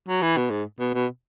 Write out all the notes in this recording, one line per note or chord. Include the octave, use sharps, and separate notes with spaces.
F#3
E3
B2
G#2
B2
B2